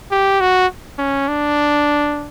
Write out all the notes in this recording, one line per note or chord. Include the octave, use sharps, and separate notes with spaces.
G4
F#4
C#4
D4